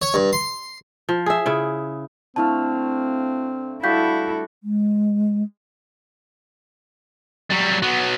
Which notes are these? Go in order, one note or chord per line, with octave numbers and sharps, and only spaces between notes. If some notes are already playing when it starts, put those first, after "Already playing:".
C#5
G2
C6
F3
G#4 E5
C#3 E4
D3 A3 C4 E4 F5 A5
G3 E4 F#4 A4 F5 G6 B6
G#3
F#3 G3
F#3 B3